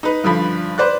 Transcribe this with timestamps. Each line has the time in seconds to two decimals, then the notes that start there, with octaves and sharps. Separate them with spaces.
0.03 D#4 B4
0.23 G2 D3 F3 B5
0.78 B4 C5 D5 F#6